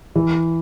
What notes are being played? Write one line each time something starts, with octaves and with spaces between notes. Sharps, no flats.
E3